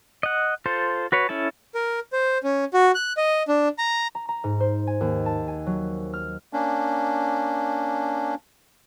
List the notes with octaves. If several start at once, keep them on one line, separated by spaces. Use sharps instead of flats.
D#5 F#5
F4 A4 C5
F#4 B4 C#5
C#4 E4 A4 A5
A#4
C5
C#4
F#4
F#6
D#5
D4
A#5
A#5
A#5
G#2
C5
G#5
D#2
A5
G#5
F#3
F6
A#3 C#4 D4